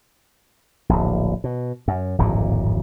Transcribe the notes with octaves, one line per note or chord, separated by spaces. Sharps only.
D1 A#1
B2
F#2
D1 G#1 F2 A#2